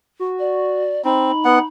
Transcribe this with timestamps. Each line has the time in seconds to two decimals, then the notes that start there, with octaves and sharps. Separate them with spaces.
0.20 F#4
0.39 D5
1.05 C4 D#4 B5
1.45 B3 F#5